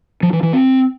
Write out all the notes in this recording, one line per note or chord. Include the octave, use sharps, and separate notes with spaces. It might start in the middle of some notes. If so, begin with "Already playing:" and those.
F3
E3
E3
C4